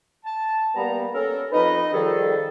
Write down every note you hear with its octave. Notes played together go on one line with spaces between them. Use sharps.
A5
G3 A#3 B3 A#5
C#4 A4 A#4
F2 D#4 B4 D#5
D#3 F3 G3 G#4 A4